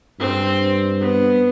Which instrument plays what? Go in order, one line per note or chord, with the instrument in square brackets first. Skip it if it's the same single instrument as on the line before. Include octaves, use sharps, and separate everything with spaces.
[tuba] G2 [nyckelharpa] C4
[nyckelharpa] B3